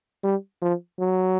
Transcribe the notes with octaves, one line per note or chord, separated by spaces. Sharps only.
G3
F3
F#3